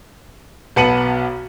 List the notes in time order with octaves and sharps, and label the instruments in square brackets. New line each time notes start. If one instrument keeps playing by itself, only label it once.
[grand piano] B1 B3 A5 C#7 D#7 F#7